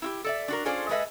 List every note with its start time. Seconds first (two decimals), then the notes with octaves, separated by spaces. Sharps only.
0.02 E4 F4 G4
0.24 A4 D5 E5
0.48 D4 F#4 A#4
0.65 C#4 F4 G#4 A4 C5 D5
0.89 G#3 G#4 A4 B4 D#5 E5